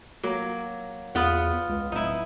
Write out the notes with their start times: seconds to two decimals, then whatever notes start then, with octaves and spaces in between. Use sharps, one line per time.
0.23 F#3 A#3
1.15 E2 B3 F4 F#5
1.69 C#2
1.92 D1 D#4 E4